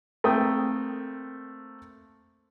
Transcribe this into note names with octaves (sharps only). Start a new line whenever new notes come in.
A3 A#3 C4 G5 D#6